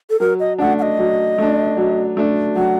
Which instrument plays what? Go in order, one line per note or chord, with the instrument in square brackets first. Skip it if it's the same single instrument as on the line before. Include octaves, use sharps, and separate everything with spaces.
[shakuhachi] A4
[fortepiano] F#3 [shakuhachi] A#4
[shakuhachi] D#5
[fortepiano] A3 D4 [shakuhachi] F#5
[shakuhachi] F#5
D#5
[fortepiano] F#3
A3 D4
F#3
A3 D4
[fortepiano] F#3 [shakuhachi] F#5